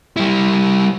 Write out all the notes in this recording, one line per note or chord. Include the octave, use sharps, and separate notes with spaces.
G3 E4